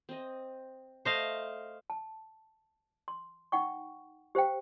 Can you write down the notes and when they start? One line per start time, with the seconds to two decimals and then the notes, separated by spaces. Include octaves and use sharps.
0.09 C4 D#5
1.05 A3 C5 D#5 F5
1.90 A5
3.08 C6
3.52 D#4 F#5 G5 C#6
4.35 G4 C5 F5 G5